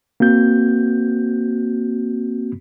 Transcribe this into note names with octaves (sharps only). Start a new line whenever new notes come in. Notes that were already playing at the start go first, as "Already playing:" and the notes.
A#3 C4 F#4 G6